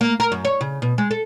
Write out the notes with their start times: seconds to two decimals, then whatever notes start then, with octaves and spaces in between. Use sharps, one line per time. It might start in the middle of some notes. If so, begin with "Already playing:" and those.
0.01 A#3
0.20 A#4
0.32 F#2
0.45 C#5
0.61 C#3
0.82 B2
0.98 G#3
1.11 A4